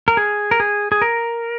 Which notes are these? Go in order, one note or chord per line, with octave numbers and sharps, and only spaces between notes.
A#4
G#4
A#4
G#4
G#4
A#4